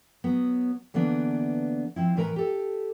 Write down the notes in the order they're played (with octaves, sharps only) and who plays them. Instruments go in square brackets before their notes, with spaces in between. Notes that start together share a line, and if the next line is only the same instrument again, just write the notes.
[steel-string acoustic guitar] F#3 B3
D3 E3 A#3 B3 D4
F3 C4 E4
A2 E3 A#4 B4 D5 A#5
G4 A4